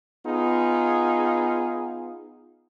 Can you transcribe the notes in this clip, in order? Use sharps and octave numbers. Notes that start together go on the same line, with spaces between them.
B3 D#4 F4 G#4